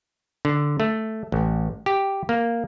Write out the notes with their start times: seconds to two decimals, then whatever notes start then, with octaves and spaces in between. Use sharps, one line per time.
0.45 D3
0.80 A3
1.32 A1
1.86 G4
2.29 A#3